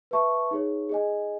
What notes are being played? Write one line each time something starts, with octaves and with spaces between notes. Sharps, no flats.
B4 E5 A5 C#6
D#4 G#4 C#5
G#4 D#5 G#5